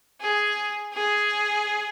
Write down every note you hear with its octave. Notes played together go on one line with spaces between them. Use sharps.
G#4
G#4